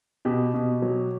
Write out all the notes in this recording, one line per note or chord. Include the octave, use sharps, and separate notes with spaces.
B2 G4
B2
F#3